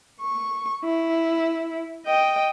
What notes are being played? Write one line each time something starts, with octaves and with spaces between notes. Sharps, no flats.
C#6
E4
D#5 G5